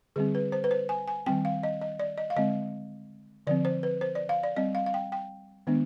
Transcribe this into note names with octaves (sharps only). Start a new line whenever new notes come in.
D3 G3 C4 G#4
B4
C5
B4
C5
G#5
G#5
D#3 G3 C4 G5
F5
D#5
D#5
D5
D#5
F5
D3 G#3 C4 D#5
D3 F3 C4 D5
C5
B4
C5
D5
F5
D5
G3 C4 D#5
F5
F5
G5
G5
D#3 G#3 B3 D4